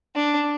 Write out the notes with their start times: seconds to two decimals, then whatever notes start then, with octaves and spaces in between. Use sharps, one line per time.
0.16 D4